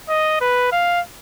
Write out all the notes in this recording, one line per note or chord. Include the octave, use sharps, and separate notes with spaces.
D#5
B4
F5